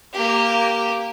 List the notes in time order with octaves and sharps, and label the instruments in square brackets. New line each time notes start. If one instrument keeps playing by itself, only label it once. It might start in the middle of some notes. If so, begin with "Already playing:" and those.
[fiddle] A#3 G4